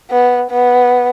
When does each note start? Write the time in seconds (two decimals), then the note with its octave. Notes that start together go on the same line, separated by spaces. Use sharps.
0.11 B3
0.51 B3